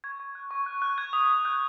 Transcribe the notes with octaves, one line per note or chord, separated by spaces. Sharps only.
C#6 G#6
C#6
F#6
C#6
F#6
F#6
F#6 G#6
D#6
D#6
F#6 G6